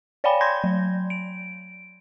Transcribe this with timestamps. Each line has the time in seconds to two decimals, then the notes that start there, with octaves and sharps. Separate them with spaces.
0.24 C#5 D5 F5 G5 G#5 B5
0.41 B5 C6 G6 G#6 A#6
0.64 F#3
1.10 D7